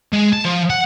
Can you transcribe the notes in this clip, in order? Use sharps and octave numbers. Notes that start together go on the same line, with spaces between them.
G#3
A5
F3
F#5